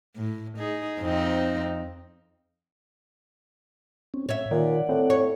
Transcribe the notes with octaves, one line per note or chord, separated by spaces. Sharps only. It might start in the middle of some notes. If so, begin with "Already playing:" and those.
A2
D#4 G#4
F2 C4 D#4
C4 C#4
A2 C#5 E5
A#2 D#3 D5 F#5
A2 C4
C#5